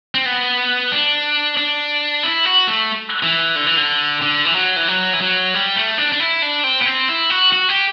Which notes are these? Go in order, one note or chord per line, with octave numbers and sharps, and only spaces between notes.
C4
B3
D4
D4
E4
F#4
A3
E3
D3
E3
D3
D3
E3
F#3
E3
F#3
E3
F#3
G3
A3
D4
D4
E4
D4
C4
B3
C4
E4
F#4
F#4
G4